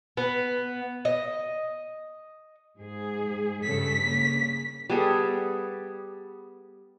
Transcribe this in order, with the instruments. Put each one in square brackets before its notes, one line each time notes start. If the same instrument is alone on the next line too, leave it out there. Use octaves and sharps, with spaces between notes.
[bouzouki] B3
D#5
[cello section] G#2 G#4
[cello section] G2 C#3 A4 [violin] B6
[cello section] C#3 A#3
[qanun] G3 B3 G#4 A4